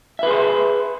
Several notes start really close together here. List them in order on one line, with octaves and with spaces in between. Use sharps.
E5 B4 G#4 C6